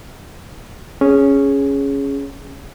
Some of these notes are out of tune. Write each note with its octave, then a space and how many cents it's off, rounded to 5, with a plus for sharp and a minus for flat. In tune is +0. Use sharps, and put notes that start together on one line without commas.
C#4 +0 G#4 +0